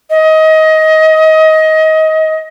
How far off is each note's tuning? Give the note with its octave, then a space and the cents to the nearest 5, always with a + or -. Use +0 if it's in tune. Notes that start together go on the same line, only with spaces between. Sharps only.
D#5 +20